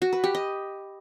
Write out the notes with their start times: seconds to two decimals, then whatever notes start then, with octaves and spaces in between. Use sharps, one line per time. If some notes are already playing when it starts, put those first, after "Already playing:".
0.02 F#4
0.13 B4
0.24 G4
0.35 D#5